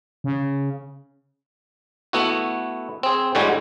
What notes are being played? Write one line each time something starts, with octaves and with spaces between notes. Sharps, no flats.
C#3
A3 B3 E4 F#4
C4 G#4
A2 D3 G3 G#3 F#4 G#5